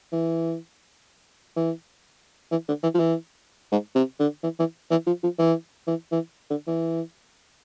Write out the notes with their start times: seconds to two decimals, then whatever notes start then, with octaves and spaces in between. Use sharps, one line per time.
0.12 E3
1.57 E3
2.51 E3
2.68 D3
2.83 E3
2.94 F3
3.00 E3
3.72 G#2
3.95 C3
4.20 D3
4.43 E3
4.59 E3
4.91 E3
5.07 F3
5.23 F3
5.39 E3
5.87 E3
6.12 E3
6.50 D3
6.67 E3